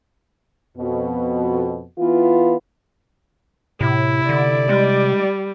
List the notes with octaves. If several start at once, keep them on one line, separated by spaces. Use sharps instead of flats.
F2 B2
E3 B3 E4 F4
A2 C3 E4
D3 D5
G3 G#3